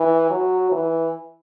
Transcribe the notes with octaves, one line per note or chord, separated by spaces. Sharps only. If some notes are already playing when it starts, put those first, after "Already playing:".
Already playing: E3
F#3
E3